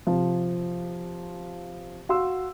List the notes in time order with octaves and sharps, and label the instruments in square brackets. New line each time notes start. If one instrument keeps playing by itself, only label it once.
[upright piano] C3 F3
F#4 F5 C6 E6